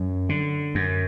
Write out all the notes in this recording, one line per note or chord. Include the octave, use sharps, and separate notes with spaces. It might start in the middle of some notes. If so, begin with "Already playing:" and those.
Already playing: F#2
D3
F#2